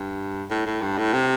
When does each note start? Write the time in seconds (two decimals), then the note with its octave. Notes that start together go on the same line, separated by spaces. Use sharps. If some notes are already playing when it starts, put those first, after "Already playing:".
Already playing: G2
0.50 A2
0.66 A2
0.82 G2
0.98 A2
1.13 C3